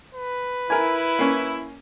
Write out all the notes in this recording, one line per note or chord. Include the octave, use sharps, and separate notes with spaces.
B4
E4 A#4 G#5
A#3 C#4